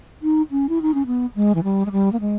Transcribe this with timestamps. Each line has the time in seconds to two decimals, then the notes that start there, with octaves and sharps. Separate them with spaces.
0.22 D#4
0.51 C#4
0.69 E4
0.82 D#4
0.94 C#4
1.06 B3
1.35 G#3
1.55 E3
1.63 G3
1.86 G#3
1.92 G3
2.12 A#3
2.20 G#3